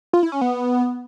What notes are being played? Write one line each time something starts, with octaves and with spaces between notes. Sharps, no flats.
F4
E4
C#4
B3